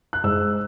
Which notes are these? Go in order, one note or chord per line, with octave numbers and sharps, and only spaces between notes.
F#6
G#2 E6